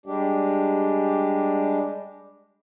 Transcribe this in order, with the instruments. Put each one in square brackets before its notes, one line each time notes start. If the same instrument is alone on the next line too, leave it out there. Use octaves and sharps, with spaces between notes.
[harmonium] G3 G#3 D4 G4